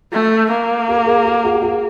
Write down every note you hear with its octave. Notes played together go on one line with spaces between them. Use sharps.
A3
A#3
G4 A4
G#4 A#4
G4 A4
F#4 G#4
G4
F#4 G#4